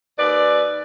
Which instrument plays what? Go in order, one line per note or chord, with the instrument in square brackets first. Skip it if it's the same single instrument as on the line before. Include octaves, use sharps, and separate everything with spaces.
[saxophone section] D#2 B4 D5